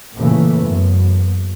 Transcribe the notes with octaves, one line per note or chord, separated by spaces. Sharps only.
A#2 C#3 E3 A3 A#3
F#1 F#2 B3